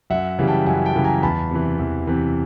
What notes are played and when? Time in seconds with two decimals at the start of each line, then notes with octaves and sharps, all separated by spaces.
0.10 F#2 E5 F#5
0.39 C#3 E3 G3
0.47 G5 A5
0.66 F#2 F#5 G#5
0.85 G5 A5
0.95 C#3 E3 G3
1.04 G#5 A#5
1.23 E2 A5 B5
1.51 C3 E3
1.79 E2
2.07 C3 E3